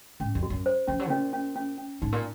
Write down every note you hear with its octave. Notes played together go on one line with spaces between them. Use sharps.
G#2 C#4
F2
F#4
F#2
C5
F3 C#4
F#3
A#2 C#4
C#4
C#4
C#4
G#2 D#4
A#2